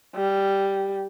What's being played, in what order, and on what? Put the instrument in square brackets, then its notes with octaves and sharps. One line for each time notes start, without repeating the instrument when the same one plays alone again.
[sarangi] G3